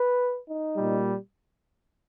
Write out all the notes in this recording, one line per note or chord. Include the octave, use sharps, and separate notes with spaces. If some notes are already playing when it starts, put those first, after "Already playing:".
Already playing: B4
D#4
A#2 G3